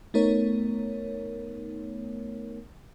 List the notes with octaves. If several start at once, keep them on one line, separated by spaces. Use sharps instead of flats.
A3 B3 D#4 A#4 C#5